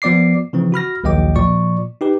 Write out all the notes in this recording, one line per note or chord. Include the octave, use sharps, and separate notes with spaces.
F3 B3 D5 D6 C7
C#3 E3 F3 C4
F#4 B5 F6 A#6
A#1 D#2 F#3 D#5 G5 D6
A#2 F3 D5 C#6
D#4 G4 B4